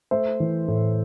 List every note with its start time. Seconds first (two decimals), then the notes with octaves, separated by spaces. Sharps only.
0.11 A3 C5 E5
0.40 E3
0.68 A2